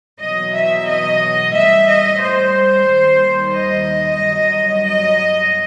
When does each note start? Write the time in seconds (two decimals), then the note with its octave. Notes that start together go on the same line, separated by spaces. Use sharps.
0.21 E2 B2 F#3 D#5
0.55 E5
0.88 D#5
1.54 A2 G3 E5
1.88 D#5
2.21 C5
2.88 D#2 D#3 G3
3.54 D#5
4.21 G2 F#3
4.87 D#5